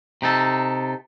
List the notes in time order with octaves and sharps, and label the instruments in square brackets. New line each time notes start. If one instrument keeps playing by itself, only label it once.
[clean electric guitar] C3 D#4 A4